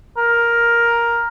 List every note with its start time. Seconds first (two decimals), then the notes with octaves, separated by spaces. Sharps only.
0.17 A#4